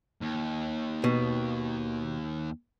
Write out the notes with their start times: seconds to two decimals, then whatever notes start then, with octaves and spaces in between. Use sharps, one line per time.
0.21 D#2
1.04 B2